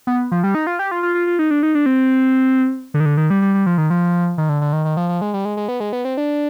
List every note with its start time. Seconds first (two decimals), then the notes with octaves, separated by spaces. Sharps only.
0.07 B3
0.32 F3
0.44 G3
0.55 D#4
0.67 F4
0.79 G4
0.91 F4
1.03 F4
1.15 F4
1.27 F4
1.39 D#4
1.51 D4
1.63 D#4
1.75 D4
1.86 C4
2.94 D3
3.00 D#3
3.06 D3
3.17 D#3
3.30 G3
3.42 G3
3.54 G3
3.66 F3
3.78 D#3
3.90 F3
4.38 D#3
4.49 D3
4.61 D3
4.73 D#3
4.85 D#3
4.97 F3
5.09 F3
5.21 G#3
5.34 G3
5.45 G#3
5.57 G#3
5.68 B3
5.80 G#3
5.93 B3
6.05 C4
6.17 D4